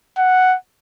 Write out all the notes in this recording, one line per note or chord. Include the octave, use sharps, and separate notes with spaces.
F#5